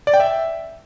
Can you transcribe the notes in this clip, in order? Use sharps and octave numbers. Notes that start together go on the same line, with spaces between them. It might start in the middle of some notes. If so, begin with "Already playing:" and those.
D5
G5
E5